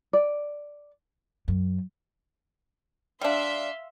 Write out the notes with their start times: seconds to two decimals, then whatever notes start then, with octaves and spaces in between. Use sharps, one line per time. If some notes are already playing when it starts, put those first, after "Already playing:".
0.13 D5
1.48 F#2
3.21 G3 D4 E5 F5 C6